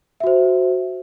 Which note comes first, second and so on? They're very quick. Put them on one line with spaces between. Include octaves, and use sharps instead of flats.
E5 F#4 C5